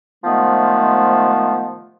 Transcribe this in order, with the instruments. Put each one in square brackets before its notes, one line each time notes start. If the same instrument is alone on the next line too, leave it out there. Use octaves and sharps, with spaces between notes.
[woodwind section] C3 D#3 F3 G#3 A3 B3